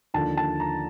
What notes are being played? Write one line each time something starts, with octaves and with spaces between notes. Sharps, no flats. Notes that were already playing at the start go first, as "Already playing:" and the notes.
D#2 D3 F3 A5
A5
A#5